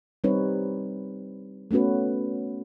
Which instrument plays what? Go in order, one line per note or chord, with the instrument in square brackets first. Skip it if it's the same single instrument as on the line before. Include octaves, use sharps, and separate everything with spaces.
[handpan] G3 C4 D#4 B4 C#5
A3 B3 C#4 F#4 B4